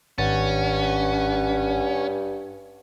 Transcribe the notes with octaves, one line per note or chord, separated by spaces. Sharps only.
G#1 G2 C#4 F#5 A6